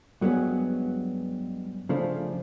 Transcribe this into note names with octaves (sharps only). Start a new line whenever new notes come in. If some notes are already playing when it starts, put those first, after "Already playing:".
G2 F#3 G#3 A#3 B3 C#4
C#3 F3 A3 D4